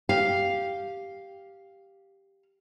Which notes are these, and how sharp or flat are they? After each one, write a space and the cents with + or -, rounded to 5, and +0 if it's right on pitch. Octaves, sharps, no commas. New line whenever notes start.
G4 +0 F5 +0